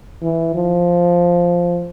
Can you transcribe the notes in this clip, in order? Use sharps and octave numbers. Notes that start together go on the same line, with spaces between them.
E3
F3